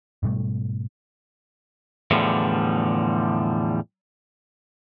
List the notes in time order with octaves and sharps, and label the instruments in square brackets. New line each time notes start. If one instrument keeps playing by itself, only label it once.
[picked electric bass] G#2 B2 G3 A3
[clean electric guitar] E2 A2 D3 F3 G3